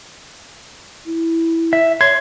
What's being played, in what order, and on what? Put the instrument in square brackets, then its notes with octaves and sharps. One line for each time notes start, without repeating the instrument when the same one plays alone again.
[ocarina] E4
[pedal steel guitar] E5
[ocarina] C#5 [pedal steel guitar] C6 [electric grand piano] G#6